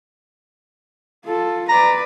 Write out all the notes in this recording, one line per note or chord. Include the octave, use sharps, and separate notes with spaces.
F4 A4
B4 D5 A#5